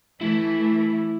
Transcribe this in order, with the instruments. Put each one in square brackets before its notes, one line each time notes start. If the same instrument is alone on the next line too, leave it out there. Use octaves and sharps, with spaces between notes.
[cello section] E3 A3 [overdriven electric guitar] E4